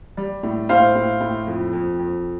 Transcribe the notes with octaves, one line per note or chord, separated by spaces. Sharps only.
G3
A2
A2 C5 F5
A2
A2
F2
F2
F2